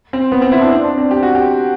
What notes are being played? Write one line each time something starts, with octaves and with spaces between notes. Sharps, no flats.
C4
B3
C4
E4
D4
C4
D4
C4
G4
F#4
G4